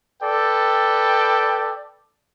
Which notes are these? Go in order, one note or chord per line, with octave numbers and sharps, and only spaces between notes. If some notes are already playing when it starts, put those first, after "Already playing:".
A4 B4 D5 G5